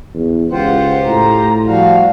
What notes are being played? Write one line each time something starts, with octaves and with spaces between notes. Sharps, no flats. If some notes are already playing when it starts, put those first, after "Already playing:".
E2
C#2 F4 G4 C5 F#5
A2 A#5
F3 G3 F#4 F5